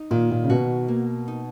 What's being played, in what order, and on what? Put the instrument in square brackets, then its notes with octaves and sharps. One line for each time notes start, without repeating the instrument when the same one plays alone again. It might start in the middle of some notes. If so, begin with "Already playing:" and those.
Already playing: [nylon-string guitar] D#4
[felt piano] A#2 [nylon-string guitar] D#3
[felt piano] A#2
C#3
[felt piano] B2 [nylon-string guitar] F#4
[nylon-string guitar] A#3
D#4